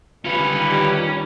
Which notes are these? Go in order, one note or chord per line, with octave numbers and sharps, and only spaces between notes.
D#3 G3 C#4 F4 B4